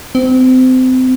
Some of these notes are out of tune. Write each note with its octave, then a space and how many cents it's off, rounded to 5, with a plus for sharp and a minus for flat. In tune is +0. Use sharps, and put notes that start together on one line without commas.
C4 -30